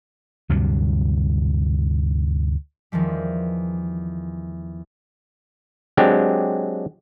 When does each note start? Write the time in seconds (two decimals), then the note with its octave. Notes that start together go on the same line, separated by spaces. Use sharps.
0.49 D2 G2 C3 F#3
2.92 E2 D#3 F3 G3
5.97 F#3 G#3 C4 D4 G4